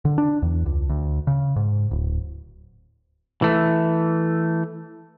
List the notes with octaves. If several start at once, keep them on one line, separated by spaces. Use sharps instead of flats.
D3
D4
E2
C#2
D2
C#3
G#2
D1
E3 A3